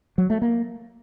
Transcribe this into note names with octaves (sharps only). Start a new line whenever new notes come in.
F#3
A3
A#3